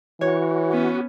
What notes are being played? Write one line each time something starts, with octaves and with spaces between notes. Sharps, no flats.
E3 F#4 C#5
B3 C#4